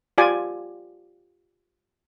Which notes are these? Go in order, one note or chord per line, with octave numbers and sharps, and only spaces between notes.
F4 G4 D5 G#5